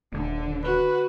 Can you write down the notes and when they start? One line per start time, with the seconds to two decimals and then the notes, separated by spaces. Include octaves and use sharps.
0.13 D#1 D3
0.64 F#4 B4